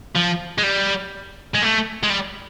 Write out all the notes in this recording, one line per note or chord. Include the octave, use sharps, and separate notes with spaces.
F3
G#3
G3
G#3
A3
G#3
G3